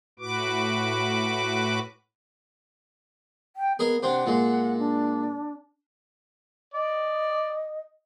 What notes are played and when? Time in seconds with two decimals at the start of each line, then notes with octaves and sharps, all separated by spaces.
0.19 A2 F#4 B4 D6
3.56 G5
3.79 B3 G#4 A#4 D#5
4.03 C3 C4 D4 F#5
4.26 A#2 G#3
4.79 D4
6.74 D5 D#5